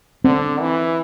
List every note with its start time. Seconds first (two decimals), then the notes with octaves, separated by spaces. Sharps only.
0.24 D3 C4
0.61 E3